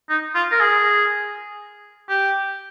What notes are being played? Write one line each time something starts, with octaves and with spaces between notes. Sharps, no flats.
D#4
F4
A#4
G#4
G4